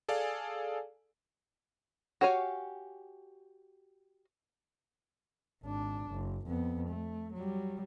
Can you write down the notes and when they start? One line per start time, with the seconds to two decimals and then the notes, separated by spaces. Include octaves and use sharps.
0.08 G#4 A4 D5 F5 G#5
2.21 F#4 G4 C#5 F5 G#5
5.63 G#1 D4
6.10 F#1
6.47 F2 B3
6.88 A3
7.33 F#3 G3